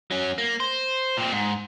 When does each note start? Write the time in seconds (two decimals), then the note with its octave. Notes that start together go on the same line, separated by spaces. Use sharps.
0.11 F#3 C#4
0.38 A#3
0.60 C5
1.18 A#2 C4
1.32 G#2